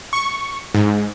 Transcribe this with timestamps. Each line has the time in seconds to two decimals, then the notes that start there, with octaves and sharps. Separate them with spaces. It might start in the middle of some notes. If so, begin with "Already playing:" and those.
0.13 C#6
0.75 G#2